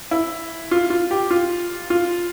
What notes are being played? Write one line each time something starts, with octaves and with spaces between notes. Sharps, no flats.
E4
F4
F4
G4
F4
F4